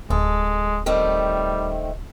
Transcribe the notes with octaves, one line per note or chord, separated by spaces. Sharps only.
D1 G#3 A4
D#3 G3 A3 C4